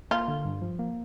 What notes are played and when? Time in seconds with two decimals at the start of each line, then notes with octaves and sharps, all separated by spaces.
0.11 A#3 F4
0.28 D3
0.45 G2
0.62 F3
0.79 A#3